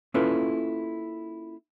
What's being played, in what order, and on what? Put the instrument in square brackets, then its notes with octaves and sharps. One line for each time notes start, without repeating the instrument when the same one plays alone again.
[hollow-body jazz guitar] A#3 C#4 E4 F4 A4 B4